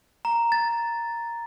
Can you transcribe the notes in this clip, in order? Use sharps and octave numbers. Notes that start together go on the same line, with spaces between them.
A#5
A6